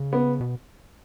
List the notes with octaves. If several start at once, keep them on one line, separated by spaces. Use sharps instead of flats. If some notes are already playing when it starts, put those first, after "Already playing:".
Already playing: C#3
B3
B2